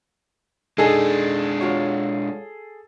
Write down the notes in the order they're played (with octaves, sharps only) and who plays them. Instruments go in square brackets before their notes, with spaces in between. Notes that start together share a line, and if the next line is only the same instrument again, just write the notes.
[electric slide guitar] G#3 D4 [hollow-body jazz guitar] D#4 [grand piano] G#4 A4
[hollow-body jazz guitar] F4 F#4 C#5